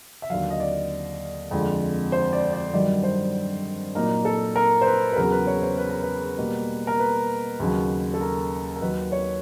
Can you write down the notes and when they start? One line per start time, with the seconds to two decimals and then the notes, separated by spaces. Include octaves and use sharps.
0.22 E5
0.30 D#2 D3 F#3 F5
0.50 D#5
0.60 D5
1.51 F2 D3 F3 G#3
2.12 C5
2.33 D5
2.53 D5
2.73 G2 D#3 F#3 D5
3.04 C5
3.95 A#2 F#3 A#3 D#4 A#4
4.25 A4
4.56 A#4
4.81 C5
4.86 B4
5.12 B4
5.16 E2 C#3 F#3 B3 A#4
5.31 B4
5.47 C#5
5.62 C5
5.78 B4
5.90 A#4
6.02 B4
6.38 B2 G3 A#3
6.87 A#4
6.99 B4
7.60 D#2 C#3 F#3
8.14 A4
8.21 A#4
8.76 A#4
8.81 D#2 D#3 F#3 B4
9.12 C#5